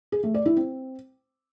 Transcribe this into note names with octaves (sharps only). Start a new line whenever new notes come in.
G#4
A3
D5
E4
C4